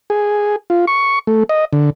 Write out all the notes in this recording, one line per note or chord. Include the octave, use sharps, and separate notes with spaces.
G#4
F4
C#6
A3
D#5
D3